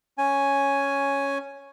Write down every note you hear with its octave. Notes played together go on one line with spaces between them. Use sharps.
C#4 G#5